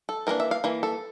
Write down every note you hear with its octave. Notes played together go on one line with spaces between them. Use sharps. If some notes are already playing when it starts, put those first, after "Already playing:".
A4
E3 A#3 D4 A#4
E5
F5
E3 A#3
A4